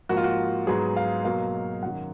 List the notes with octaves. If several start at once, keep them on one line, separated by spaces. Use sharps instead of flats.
G#2 F3 A#3 F#4
F4
F#4
G#2 F#3 B3 G#4
F5
B2 F#3 A#3 F5
F#2 D#3 F#3 F#5